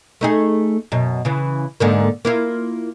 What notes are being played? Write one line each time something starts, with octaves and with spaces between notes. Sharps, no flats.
A3 D#4 G#4
F#2 B2
C#3 E3
G#2 D3 A#3
A#3 E4 F4